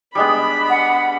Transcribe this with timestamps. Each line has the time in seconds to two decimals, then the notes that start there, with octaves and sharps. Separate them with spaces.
0.15 G3 G#3 B3 D4 B5
0.69 F#5